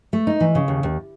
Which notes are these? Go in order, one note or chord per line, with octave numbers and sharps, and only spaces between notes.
A3
D#4
E3
C#3
D#2
D#2